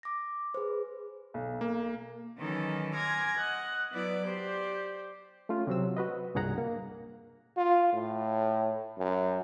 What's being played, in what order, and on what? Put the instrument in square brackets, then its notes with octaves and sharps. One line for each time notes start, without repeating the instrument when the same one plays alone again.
[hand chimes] D6 A#6
G#4 B4 C5
[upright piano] B1
[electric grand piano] A#3
[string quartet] D#3 E3 F#3 C#4 D#4 A4
G#5 C6 D6 F6 G#6 A#6
D#5 F#5
F#3 B3 E4 D5 D6
G4 C5 D5
[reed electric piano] A3 C#4 F4
C3 F#3 C4 E6
F#4 B4 D#5
C2 G2 A#2 G#4 F#5 A#5
A#3
[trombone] F4
A2
F#2